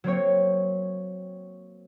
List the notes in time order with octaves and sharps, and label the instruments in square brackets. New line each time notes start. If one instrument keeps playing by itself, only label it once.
[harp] F#3 A#3 C4 C#5